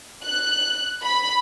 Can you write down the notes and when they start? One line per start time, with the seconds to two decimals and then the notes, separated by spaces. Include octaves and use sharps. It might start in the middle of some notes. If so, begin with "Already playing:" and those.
0.24 F#6
1.03 B5